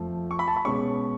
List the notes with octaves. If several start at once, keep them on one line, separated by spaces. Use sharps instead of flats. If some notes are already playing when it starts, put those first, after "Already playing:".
Already playing: F2 F3 A3
C#6
B5
A5
B5
B2 G#3 C#4 C#6